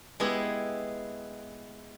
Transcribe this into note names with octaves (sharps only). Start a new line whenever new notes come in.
G#3 B3 E4 G4 G#4